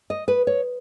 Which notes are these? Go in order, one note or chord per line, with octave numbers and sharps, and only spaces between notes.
D#5
B4
C#5